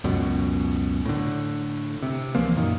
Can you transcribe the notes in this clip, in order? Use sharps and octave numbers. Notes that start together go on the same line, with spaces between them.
C#2 F#2 B2
A2 D3
C3
C2 E3 F3 A#3
F#2 A#2 D#3